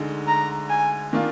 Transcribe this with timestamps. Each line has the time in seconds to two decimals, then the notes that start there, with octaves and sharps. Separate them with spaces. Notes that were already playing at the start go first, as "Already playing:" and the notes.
Already playing: D2 D3 G#3 D#4
0.27 A#5
0.70 G#5
1.13 D#3 A#3 D4 F4